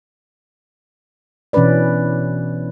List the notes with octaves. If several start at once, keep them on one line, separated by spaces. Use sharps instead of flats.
B2 E3 C#4 D4 B4 D5